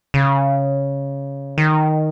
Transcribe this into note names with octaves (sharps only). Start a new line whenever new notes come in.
C#3
D#3